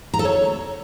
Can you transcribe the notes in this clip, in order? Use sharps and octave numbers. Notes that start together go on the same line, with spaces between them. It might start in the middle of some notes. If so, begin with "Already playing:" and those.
A#5
A4
C#5